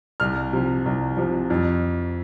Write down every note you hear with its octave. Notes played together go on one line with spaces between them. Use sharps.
C2 F6
C3 F3
C2
C3 F3
F2